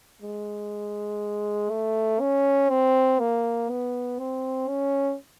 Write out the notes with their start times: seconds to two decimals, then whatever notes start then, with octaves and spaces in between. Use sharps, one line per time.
0.22 G#3
1.70 A3
2.20 C#4
2.70 C4
3.20 A#3
3.70 B3
4.19 C4
4.69 C#4